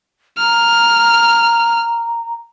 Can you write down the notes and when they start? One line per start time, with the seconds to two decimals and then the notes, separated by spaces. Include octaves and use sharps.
0.38 A#5 F6